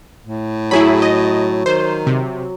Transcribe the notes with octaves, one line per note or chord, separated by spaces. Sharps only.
A2
F#3 E4 G#4 B5
D#5
D#3 C5
C3